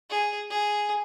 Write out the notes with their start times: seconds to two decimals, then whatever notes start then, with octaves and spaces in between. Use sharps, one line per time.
0.10 G#4
0.50 G#4